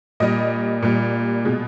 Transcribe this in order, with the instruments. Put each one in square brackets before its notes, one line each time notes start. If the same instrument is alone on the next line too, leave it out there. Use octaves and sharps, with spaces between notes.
[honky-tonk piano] A#2 G3 D#5
A#2 G3
B2 G#3